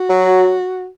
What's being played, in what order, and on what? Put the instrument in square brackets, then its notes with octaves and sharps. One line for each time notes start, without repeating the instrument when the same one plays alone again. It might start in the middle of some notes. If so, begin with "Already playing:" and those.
Already playing: [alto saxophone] F#4
[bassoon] F#3